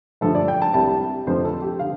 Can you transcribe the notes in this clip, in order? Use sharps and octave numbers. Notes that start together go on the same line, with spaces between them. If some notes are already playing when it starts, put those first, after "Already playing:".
G2 D3 F3 A3 A4
D5
G5
A5
C2 C3 G3 A5
F2 D3 F3 A3 C5
A4
G4
D3 F5